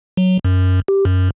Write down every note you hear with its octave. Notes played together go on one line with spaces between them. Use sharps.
F#3
F#2
G4
F#2